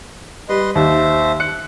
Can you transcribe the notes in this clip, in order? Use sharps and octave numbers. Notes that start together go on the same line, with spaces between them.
G3 B4 D#5 C6
D#2 C5 E5
F#6 C#7